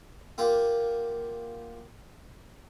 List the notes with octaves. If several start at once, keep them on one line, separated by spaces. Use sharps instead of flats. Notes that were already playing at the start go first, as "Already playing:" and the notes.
A#3 F4 G4 F#5